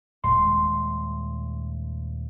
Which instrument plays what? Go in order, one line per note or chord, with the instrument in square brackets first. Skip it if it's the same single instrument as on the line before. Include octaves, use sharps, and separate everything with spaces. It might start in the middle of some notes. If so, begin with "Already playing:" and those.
[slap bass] D#1 G#3 [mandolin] C6